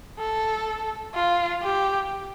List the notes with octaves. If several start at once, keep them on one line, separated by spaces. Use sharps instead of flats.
A4
F4
G4